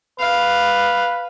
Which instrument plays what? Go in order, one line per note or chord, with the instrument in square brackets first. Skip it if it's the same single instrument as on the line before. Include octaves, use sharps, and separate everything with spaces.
[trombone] B4 [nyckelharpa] F5